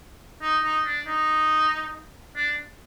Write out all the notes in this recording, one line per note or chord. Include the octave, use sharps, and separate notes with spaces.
D#4
D#4
D4
D#4
D4